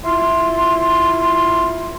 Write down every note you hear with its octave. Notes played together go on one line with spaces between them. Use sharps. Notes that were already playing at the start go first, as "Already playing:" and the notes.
E4 F4 C6